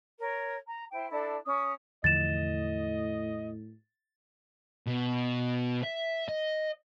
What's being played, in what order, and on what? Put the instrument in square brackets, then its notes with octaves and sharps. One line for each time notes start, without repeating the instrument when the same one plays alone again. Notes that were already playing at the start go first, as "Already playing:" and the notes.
[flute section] A#4 C#5
A#5
E4 C5 G5
D4 E4 A4 D5
C#4 D#6
[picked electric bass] E2 D3 F3 [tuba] A2 [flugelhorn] D#5 [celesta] A6 E7
[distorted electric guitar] B2
E5
D#5